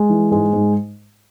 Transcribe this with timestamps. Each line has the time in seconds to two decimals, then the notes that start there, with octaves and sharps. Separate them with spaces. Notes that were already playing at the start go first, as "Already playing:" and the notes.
Already playing: G#3
0.10 E3
0.31 G#2 G#3
0.53 G#2